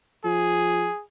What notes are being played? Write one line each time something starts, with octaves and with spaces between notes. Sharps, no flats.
F3 G#4